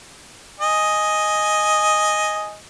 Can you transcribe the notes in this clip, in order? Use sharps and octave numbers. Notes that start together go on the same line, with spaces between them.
D#5 G#5